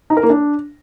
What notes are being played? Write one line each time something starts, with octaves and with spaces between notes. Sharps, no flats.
D#4
A#4
A#3
D4